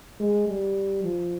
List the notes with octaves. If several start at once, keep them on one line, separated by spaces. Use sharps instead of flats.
G#3
G3
F3